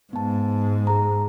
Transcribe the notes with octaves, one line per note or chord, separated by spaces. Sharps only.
G#2 B3 A5
G#4 A#5